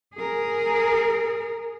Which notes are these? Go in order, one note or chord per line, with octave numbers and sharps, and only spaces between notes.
G#4 A#4